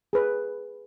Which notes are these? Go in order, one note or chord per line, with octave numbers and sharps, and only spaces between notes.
G#4 B4